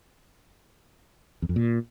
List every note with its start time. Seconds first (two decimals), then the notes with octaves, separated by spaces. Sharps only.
1.42 E2
1.49 F2
1.56 A#2